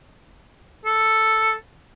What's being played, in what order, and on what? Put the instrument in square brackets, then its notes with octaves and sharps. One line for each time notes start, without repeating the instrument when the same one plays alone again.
[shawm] A4